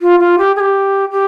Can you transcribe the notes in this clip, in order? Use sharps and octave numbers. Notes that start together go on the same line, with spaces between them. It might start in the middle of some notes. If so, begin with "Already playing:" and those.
F4
F4
G4
G#4
G4
G4